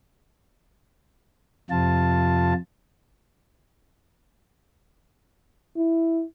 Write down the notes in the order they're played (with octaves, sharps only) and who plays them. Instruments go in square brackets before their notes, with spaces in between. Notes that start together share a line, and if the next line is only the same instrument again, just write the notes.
[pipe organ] F2 C3 F3 F4 A5
[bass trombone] E4